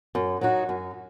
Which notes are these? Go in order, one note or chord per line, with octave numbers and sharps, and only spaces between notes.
F#2
F#3 D#4 F#4
F#2